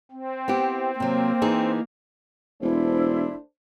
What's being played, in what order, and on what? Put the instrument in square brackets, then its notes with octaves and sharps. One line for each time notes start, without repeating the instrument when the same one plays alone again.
[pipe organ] C4
[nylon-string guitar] B3 E4 G4
[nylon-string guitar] C3 F#3 [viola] A#3
[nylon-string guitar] E3 D#4 G#4
[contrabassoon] E1 [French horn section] A3 D4 C5 [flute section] E4